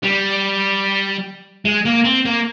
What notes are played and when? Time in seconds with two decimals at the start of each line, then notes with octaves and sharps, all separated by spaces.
0.03 G3
1.65 G#3
1.85 A#3
2.05 C4
2.26 A#3